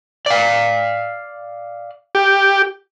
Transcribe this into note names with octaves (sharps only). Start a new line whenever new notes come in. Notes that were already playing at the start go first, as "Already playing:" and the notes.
D5 F5
G4